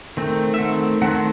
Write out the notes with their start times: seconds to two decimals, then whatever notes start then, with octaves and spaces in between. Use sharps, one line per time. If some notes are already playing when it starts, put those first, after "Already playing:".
0.17 D#3 A3 C4
0.54 E5
0.59 D#3 A3 C4 F#5
1.02 D#3 A3 C4 F#5